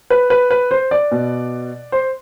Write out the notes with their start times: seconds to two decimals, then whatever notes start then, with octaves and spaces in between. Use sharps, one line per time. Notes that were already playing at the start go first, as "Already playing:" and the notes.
0.10 B4
0.30 B4
0.51 B4
0.71 C5
0.91 D5
1.12 B2
1.92 C5